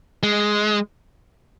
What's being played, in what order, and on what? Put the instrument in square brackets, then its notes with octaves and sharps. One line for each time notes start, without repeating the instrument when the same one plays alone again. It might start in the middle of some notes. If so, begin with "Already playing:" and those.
[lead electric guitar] G#3